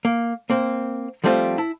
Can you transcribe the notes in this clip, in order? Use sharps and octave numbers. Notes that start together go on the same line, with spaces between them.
A#3
A#3 C4
F3 G3 A3 C4 D#4 F4
E4 A5